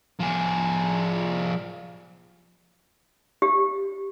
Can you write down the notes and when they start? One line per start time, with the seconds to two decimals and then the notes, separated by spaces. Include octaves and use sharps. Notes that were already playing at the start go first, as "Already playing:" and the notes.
0.20 F3 G#4
3.42 G4